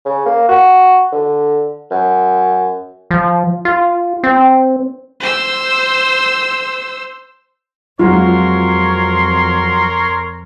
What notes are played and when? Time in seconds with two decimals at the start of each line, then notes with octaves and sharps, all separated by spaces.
0.05 C#3
0.25 A#3
0.49 F#4
1.12 D3
1.91 F#2
3.11 F3
3.65 F4
4.23 C4
5.20 C5 E6
7.99 F2 F#3 G#3 C4 F4 A#4 C#5 C6